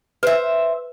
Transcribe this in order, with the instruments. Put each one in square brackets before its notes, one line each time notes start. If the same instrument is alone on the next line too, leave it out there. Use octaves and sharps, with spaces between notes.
[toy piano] B4 [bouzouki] C5 E5